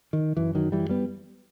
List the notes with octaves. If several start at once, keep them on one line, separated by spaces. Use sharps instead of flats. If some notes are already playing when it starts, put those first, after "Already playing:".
D#3
F#2 E3
D#3 F#3
E3 G3
G3 B3